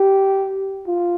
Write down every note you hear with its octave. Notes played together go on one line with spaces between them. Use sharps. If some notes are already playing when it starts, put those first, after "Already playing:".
Already playing: G4
F4